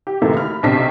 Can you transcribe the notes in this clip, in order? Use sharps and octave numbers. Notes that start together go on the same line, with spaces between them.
G4
F#2 C3 D#3 E3 A3 A#3
B5 F6
B1 C3 D4 A5 B6 C7